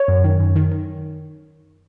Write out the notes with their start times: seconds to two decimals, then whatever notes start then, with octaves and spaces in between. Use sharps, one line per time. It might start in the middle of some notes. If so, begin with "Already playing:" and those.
Already playing: C#5
0.08 F#2
0.24 D#3
0.40 F#2
0.56 D#3
0.72 D#3